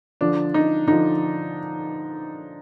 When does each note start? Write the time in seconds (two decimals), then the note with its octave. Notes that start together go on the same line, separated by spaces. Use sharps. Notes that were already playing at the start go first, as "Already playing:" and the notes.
0.21 D3 F3 D4
0.54 D#4
0.87 D3 F3 D#4